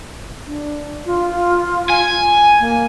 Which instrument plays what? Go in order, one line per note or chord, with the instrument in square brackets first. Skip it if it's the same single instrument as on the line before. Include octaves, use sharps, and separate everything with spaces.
[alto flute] D4
F4
[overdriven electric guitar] G#5
[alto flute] A#3